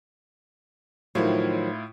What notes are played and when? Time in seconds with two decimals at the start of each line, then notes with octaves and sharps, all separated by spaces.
1.15 A2 D#3 F3 F#3 E4 F4